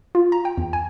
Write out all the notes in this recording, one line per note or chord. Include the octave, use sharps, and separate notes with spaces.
F4
A#5
G5
E2
G#5